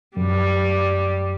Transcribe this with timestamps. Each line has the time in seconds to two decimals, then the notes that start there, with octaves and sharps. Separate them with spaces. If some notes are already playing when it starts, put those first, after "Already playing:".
0.17 F#2 G3